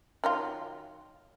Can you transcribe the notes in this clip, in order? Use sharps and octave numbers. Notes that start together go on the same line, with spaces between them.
D#3 F#3 F4